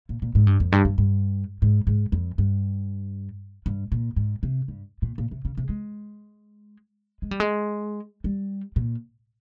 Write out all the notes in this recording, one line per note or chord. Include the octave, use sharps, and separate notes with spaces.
A#2
A#2
G#2
G2
F2
G2
G2
G2
G#2
G#2
F2
G2
G2
A#2
G#2
C3
G2
A#2
A#2
C3
C#3
C3
G#3
G#3
G3
G#3
G3
A#2